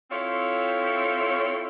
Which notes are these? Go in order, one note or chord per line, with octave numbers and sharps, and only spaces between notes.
C4 E4 F4 A4 C#5